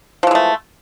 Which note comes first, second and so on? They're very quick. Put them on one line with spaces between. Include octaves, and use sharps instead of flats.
F3 E3 G#3 A3